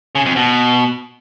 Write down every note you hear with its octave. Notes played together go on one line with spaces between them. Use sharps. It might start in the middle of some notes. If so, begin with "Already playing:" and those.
C#3
F2
B2